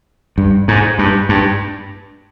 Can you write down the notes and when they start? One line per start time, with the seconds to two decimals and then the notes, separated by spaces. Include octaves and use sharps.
0.38 G2
0.68 G#2
0.99 G2
1.29 G2